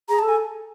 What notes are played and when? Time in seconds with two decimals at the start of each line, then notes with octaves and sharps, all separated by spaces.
0.09 G#4 A#5
0.19 A5
0.23 A4
0.29 G#5